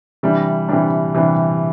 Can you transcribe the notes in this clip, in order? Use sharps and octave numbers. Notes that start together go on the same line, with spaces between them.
C3 E3 G3 D4
C3 E3 G3 D4
C3 E3 G3 D4